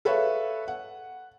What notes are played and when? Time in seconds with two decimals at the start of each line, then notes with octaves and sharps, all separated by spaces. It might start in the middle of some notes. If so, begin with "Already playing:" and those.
0.05 A4 B4 C#5 E5 F5
0.68 F#5